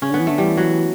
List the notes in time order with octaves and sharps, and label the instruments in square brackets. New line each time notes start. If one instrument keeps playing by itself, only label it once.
[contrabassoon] C#3 [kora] C#4
[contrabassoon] D3
[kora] B3
[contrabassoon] E3
[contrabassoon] D3 [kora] A3
[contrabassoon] E3 [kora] G3
[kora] F#3